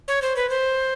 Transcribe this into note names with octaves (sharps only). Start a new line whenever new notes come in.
C#5
C5
B4
C5